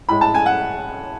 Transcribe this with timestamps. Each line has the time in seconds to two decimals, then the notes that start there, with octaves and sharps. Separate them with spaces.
0.09 A2 G#3 B5
0.21 A5
0.35 G#5
0.46 F#5